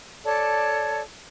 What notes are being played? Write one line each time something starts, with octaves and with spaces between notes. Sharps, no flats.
A4 C#5 D5 A5